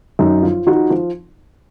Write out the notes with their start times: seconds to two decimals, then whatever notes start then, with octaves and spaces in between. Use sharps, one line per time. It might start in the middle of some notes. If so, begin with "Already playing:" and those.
0.19 F#2 D#4
0.43 F3 F4
0.67 F3 D#4 F#4
0.90 F3 F4